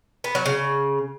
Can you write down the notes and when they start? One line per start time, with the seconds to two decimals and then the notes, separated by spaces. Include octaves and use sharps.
0.24 B3
0.35 F#3
0.46 C#3